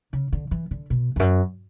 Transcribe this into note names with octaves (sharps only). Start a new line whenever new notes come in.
C#3
D3
E3
D3
B2
E2
F#2